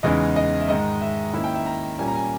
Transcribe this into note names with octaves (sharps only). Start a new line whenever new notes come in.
E2 C#3 E3 G#3 D#4 D#5
D#5
E5
G#2 D#3 G#3 D#5
E5
D#3 A#3 C#4 E4 E5
G5
E5
A#5
A#2 G3 A#3 C#4 G#5
A#5
G#5